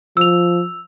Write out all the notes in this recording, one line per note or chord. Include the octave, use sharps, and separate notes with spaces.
F3 E6 F7